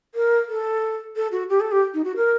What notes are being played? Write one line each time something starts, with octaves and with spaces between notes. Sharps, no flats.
A#4
A4
A4
F#4
G4
A4
G4
D#4
F#4
A#4